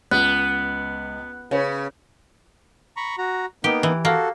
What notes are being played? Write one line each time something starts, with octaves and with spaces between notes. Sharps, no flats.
C#2 B3 F#6
C#3 B4 C#5
A#5 B5 C#6
F#4 A#5
A#3 B3 D#4 G4
E3
A#3 F#4 A4